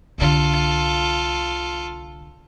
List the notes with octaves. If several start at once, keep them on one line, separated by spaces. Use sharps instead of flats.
C2 D3 F4 A4